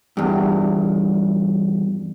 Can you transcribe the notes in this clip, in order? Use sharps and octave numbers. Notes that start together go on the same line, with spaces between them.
E2 G2